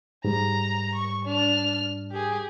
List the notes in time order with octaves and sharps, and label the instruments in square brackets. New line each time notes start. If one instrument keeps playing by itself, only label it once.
[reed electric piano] G#2 G3 [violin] A#5
[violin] C#6
D4 F6
G4 G#4